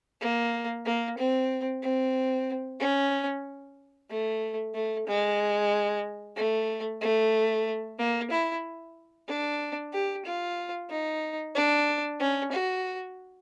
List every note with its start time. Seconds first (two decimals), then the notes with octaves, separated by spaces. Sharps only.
0.21 A#3
0.86 A#3
1.18 C4
1.83 C4
2.80 C#4
4.10 A3
4.74 A3
5.07 G#3
6.36 A3
7.01 A3
7.98 A#3
8.31 E4
9.28 D4
9.93 G4
10.26 F4
10.90 D#4
11.55 D4
12.20 C#4
12.52 F#4